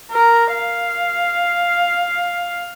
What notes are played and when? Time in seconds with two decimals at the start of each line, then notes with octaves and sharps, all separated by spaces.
0.11 A#4
0.54 F5